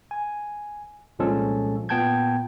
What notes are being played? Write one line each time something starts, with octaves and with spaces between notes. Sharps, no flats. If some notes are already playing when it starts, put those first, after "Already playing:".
G#5
C2 A#2 F3 G#3 C#4 A4
A#2 B3 G5 A5 G6 G#6